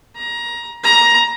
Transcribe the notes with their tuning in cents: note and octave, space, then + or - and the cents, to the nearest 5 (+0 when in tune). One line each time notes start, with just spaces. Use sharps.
A#5 +20
A#5 +15